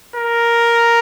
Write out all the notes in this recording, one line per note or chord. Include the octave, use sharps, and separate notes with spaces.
A#4